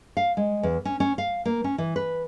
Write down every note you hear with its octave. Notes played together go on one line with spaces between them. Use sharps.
F5
G#3
E2
C#4
C#4
F5
A#3
C#4
E3
B4